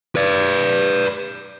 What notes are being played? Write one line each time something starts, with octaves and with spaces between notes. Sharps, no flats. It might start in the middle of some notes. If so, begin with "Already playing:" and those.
B4 D5